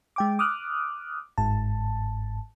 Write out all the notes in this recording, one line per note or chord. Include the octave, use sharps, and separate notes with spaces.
G#3 G5 D6
D6 D#6 F6 F#6
G1 G#2 A5